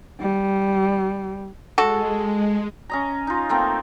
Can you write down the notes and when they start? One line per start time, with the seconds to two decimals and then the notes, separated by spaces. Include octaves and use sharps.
0.21 G3
1.78 G#3 F#4 A4
2.90 C#4 D#5 A#5
3.27 D#4 F4
3.49 A3 A#3 C4